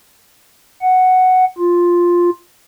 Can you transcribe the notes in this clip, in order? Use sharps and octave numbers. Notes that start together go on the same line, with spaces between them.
F#5
F4